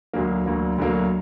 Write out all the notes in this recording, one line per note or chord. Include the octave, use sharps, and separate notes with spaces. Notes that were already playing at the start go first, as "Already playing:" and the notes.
D2 D3 F#3 A#3
D2 D3 F#3 A#3
D2 D3 F#3 A#3